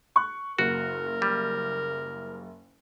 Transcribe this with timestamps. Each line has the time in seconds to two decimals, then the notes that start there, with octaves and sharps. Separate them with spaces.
0.16 C#6 F#6
0.59 F#1 F#4 A#4
1.22 G3